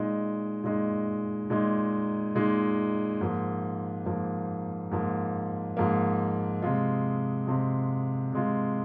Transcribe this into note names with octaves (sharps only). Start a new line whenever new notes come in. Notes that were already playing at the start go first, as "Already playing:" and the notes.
Already playing: A#2 G#3 D#4
A#2 G#3 D#4
A#2 G#3 D#4
A#2 G#3 D#4
G#2 F3 A#3
G#2 F3 A#3
G#2 F3 A#3
G#2 F3 A#3
C3 G#3 F4
C3 G#3 F4
C3 G#3 F4